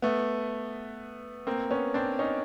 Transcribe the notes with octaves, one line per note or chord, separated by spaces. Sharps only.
A3 B3
A#3 C4
B3 C#4
C4 D4
C#4 D#4